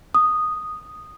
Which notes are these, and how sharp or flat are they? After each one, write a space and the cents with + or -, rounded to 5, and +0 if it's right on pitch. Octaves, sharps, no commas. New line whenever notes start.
D#6 -5